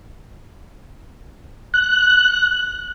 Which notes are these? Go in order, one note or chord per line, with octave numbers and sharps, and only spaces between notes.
F#6